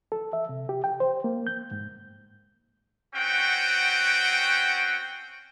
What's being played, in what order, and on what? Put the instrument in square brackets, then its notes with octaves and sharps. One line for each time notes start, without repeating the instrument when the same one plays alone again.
[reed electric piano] A4
E5
C3
G4
G5
C5
A#3
G6
G#2
[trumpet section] C4 C#4 F#4 F#5 G5